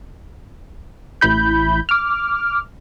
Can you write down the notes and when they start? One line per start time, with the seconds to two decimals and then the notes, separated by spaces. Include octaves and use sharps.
1.21 A1 E4 B5 G6
1.89 D6 F6